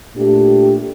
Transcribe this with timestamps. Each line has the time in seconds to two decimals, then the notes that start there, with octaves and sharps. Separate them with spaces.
0.15 A#2 A3 D4 G4